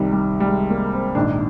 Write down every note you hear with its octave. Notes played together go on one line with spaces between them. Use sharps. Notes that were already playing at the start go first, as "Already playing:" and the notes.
Already playing: C2 C3 D#3 G3
G3
G3
G#3
A#3
C4
A#1 G#2 D#3 D4